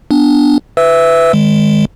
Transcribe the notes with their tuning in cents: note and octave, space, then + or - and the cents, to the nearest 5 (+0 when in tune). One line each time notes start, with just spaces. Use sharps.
B3 +0 D4 +0
B4 +25 E5 +5 E6 -15
D#3 -10 G#3 +0